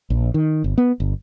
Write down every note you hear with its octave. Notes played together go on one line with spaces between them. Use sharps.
A#1
D#3
G1
B3
G1